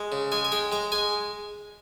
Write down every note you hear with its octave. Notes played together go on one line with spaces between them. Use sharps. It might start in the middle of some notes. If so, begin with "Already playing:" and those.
Already playing: G#3
C#3
G#3 G#5
G#5
G#3 G5
G#3 A#5
G#3 G#5